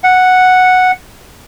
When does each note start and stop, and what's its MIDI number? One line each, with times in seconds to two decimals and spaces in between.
0.04 0.92 78